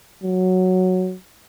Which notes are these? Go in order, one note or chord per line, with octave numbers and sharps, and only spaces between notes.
F#3